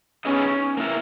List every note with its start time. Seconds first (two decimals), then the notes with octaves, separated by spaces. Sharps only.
0.25 B3 C#4 D#4 G#4 D#5
0.77 A#3 E4 A#4